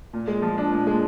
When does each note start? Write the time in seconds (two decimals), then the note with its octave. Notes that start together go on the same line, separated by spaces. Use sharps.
0.13 A#2
0.28 G#3
0.42 F3
0.58 D4
0.72 A#2
0.87 G#3